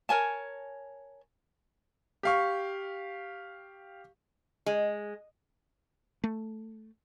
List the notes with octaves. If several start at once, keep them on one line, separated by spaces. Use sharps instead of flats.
A#4 C#5 G#5 A5
G4 F5 C#6
G#3
A3